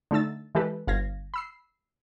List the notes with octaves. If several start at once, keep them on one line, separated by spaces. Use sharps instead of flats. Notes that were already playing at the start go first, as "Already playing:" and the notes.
D3 A3 D#4 E6 A6
E3 G#3 G4 A4 B4
G1 F5 G#6 A#6
B5 E6 C7